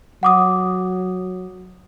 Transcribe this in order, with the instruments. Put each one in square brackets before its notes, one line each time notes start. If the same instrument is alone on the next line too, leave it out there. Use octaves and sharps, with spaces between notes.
[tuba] F#3 [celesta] F#5 D6 D#6